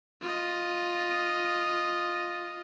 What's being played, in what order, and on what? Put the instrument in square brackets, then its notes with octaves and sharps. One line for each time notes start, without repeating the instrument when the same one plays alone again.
[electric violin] F4 D#5